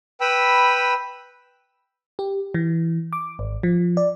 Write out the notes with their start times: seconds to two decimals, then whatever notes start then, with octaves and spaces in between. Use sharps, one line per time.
0.21 B4 G5 B5 E6
2.19 G4
2.54 E3
3.13 D6
3.39 G#1
3.63 F3
3.97 D5